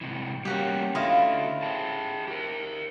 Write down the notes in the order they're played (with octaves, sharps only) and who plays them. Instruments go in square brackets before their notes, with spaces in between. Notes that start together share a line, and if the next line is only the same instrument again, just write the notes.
[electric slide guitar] G#2 C3 E3
[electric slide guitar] G3 A#3 B3 [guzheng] C#4 F#4 G4
[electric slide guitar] D3 A3 [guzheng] E4 F4 D#5
[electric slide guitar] G#4 C5 A5
G4 A#4